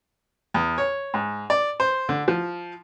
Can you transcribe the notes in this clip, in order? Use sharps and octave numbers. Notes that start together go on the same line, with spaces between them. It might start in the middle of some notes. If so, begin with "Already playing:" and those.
E2
C#5
G#2
D5
C5
D3
F3